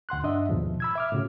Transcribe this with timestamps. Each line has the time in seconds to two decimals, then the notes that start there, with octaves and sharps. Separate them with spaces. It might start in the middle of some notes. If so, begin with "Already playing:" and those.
0.09 D2 F#5 C6 F#6
0.23 G2 D4 D#5 E5
0.49 D#2 G#2 B2 F3
0.80 B5 E6 G#6
0.95 E5 D6 F6
1.12 A2 C#3 F#4